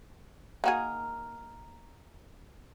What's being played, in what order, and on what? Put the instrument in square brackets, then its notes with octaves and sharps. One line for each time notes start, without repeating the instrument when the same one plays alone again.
[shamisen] A#3 F#4 G#4 [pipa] D#4 A#4